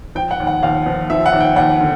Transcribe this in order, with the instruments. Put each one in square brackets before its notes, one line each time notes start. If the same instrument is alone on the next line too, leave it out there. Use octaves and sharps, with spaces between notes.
[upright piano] F3 G5
F#5
D#2
F#5
D#2 F5
F3
F3 E5
F#5
D#2
G5
D#2 F#5
D3